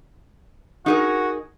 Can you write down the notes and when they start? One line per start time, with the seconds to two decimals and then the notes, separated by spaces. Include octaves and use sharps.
0.86 D#4 F#4 G#4 A#4